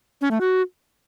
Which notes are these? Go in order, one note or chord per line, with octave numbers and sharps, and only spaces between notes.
C#4
A3
F#4